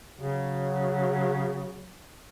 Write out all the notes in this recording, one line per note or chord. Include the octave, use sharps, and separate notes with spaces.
C#3 F#3